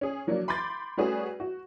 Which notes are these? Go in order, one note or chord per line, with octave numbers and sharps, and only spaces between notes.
C#4 G#4
F3 F#3 A#3 D4
B5 C6 D6 G6 A6
G3 A3 C#4 F#4 G#4 B4
F#4